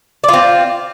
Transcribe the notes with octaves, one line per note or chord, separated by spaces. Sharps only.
C4 F4 D5